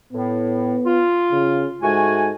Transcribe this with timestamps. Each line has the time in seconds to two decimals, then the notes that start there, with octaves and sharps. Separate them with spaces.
0.13 A2 B3
0.85 F4
1.32 C#3
1.82 G#2 A3 F#4 G#5